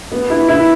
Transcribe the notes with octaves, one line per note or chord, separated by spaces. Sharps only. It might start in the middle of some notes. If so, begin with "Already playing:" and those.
B3
E4
E4